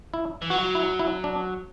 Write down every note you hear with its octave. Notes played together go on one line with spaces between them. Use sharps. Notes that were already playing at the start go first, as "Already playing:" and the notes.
E4
E3
F#3 F#4
E4
E4
D4